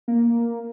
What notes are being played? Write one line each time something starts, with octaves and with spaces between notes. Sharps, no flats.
A#3